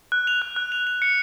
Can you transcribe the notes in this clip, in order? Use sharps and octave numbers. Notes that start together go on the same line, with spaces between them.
F#6
F7
F#6
F#6
F7
F7
C#7